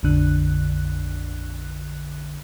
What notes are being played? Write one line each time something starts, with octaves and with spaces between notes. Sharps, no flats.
A#1 F2 D3 F#6